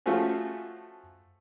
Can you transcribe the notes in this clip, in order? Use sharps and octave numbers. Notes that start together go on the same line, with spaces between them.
F3 A3 C#4 F4 F#4 G#4